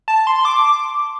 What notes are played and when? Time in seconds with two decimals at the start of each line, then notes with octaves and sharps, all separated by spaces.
0.08 A5
0.27 C6
0.45 D6